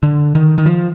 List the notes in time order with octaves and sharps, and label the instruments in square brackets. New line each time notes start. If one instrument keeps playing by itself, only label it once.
[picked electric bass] D3
D#3
D#3
F3